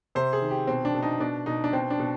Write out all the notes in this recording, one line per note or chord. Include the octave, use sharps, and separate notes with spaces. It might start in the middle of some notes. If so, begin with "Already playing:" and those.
C3 C5
G#4
D#3
G4
B2 C4
D4
B2
D#4
B2 D4
B2 D#4
D4
B2 C4
D4
B2